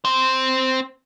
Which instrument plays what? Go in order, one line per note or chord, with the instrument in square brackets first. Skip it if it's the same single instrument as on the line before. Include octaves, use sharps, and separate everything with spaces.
[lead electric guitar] C4 C5